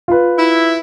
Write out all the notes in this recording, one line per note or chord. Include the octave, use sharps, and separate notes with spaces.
F4 B4
E4